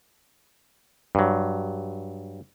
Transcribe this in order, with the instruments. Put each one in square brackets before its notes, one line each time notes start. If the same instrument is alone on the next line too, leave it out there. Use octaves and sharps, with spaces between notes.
[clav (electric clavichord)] G2 F#3